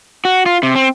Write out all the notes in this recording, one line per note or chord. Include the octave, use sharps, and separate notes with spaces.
F#4
F4
C3
C4